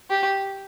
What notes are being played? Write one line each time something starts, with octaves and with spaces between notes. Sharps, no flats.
G4